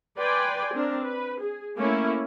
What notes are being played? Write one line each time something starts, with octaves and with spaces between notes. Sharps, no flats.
B4 D5 G5 G#5 C6
C4 D4 A#4
B4
G#4
A3 A#3 C#4 E4